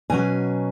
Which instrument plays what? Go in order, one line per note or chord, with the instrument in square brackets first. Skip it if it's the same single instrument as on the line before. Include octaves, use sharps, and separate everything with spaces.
[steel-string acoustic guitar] B2 F#3 C#4 G#5